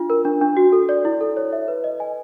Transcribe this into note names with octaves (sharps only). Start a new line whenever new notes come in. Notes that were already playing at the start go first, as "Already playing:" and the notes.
Already playing: D4 F4
A#4
D4
D4
F#4
A4
D5
E4
A4
C#5
E5
B4
D#5
G#5